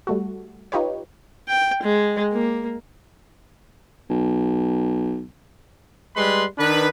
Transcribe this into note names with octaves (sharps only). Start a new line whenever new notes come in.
G3 A3 F#4
D#4 F4 G4 B4 C#5
G5
G#3
A#3
B1
G3 G#3 B4 B5 C6
D#3 D4 B4